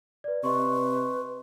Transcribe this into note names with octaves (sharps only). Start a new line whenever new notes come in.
B4 D5
C3 B4 D#5 C6 C#6